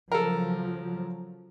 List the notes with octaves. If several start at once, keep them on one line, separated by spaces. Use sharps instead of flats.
C#3 F3 F#3 A4 A#4